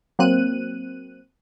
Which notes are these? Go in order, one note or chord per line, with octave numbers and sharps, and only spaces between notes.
F#3 A#3 C4 F#6 D#7